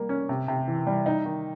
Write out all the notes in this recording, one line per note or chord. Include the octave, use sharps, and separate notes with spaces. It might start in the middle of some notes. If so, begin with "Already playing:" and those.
Already playing: G3 A#3
C#4
C3
C3
E3
G3
D#4
D#3